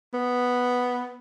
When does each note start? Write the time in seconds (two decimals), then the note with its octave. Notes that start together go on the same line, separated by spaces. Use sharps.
0.14 B3